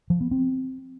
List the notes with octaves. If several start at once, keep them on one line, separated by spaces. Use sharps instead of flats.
F3
B3
C4